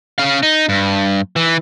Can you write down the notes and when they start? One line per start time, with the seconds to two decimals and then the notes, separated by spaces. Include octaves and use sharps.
0.18 C#4 F5
0.43 D#4
0.69 G2
1.36 E3